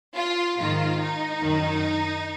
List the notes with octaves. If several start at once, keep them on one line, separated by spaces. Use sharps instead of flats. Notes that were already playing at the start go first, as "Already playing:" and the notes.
F4
G#2 D#3 F4
D#4
F#2 D#3